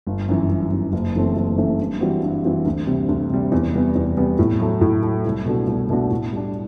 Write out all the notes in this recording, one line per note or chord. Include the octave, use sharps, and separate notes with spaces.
G1
F#2 E3
G1
F#2 E3
F#1
F#2 E3 A3 C4
F#1
F#2 E3 A3 C4
G2
E3 G3 C4 F#4
G2
E3 G3 C4 F#4
D2
C3 G3
D2
C3 G3
E2
C3 G3 B3
E2
C3 G3 B3
A2
F#3 A3
A2
F#3 A3
C2
B2 A3 D4 F#4
C2
B2 A3 D4 F#4
A2
G3 D4